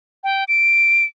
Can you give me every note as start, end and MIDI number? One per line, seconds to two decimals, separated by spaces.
0.24 0.44 79
0.48 1.04 98